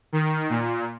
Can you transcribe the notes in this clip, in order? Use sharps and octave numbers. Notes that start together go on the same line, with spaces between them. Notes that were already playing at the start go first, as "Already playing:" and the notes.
D#3
A#2